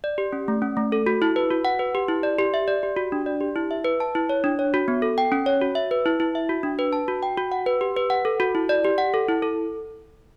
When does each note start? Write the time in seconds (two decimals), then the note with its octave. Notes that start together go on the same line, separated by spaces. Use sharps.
0.04 D5
0.18 G4
0.33 C#4
0.48 A3
0.62 C#4
0.77 A3
0.92 A4
1.06 F#4
1.22 E4
1.36 B4
1.50 F#4
1.65 F#5
1.79 B4
1.95 G4
2.08 E4
2.23 D5
2.39 G4
2.54 E5
2.68 D5
2.83 G4
2.96 F#4
3.12 D4
3.26 D5
3.41 G4
3.56 E4
3.71 E5
3.84 B4
4.00 A5
4.15 E4
4.29 C#5
4.44 D4
4.59 C#5
4.74 F#4
4.88 B3
5.02 A4
5.18 G5
5.32 C#4
5.46 C#5
5.61 F#4
5.75 E5
5.91 B4
6.06 E4
6.20 E4
6.35 E5
6.49 F#4
6.63 D4
6.79 B4
6.93 A5
7.08 F#4
7.23 G5
7.37 F#4
7.52 F#5
7.66 B4
7.81 G4
7.96 B4
8.10 F#5
8.25 A4
8.40 F#4
8.55 E4
8.69 D5
8.84 G4
8.98 F#5
9.14 A4
9.29 E4
9.42 A4